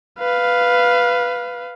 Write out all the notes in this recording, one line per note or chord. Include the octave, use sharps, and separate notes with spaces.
B4 F5